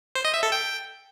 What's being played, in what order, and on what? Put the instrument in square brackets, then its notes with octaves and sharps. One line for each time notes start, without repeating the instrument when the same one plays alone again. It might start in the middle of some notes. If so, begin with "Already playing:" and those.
[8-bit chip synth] C5
D#5
E5
A4
G5